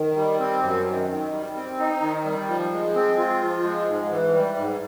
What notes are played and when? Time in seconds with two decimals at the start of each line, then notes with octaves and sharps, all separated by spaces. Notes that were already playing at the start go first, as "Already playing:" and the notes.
Already playing: D#3
0.16 G3
0.40 C4
0.63 F#2
0.87 D#3
1.10 D#3
1.32 G3
1.56 C4
1.79 D#4
2.02 D#3
2.25 G3
2.48 F3
2.72 G#3
2.95 C4
3.18 F4
3.42 F3
3.64 G#3
3.88 G#2
4.11 E3
4.34 G3
4.58 G#2